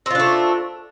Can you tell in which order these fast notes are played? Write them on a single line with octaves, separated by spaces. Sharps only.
C4 F4 D4 A3